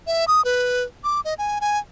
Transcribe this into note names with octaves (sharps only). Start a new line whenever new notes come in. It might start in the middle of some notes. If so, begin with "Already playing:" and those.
E5
D#6
B4
D6
D#5
G#5
G#5